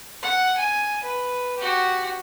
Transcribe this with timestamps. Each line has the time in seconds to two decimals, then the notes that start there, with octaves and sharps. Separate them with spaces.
0.23 F#5
0.58 G#5
1.03 B4
1.58 F#4 G4